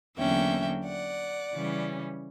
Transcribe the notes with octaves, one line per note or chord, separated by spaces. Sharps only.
E2 D3 F#3 A#3 C#4 E5 G5
D5 F#5
C#3 E3 G3 C#4